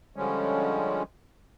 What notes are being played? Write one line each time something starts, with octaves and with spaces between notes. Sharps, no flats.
D3 F3 G3 G#3 C#4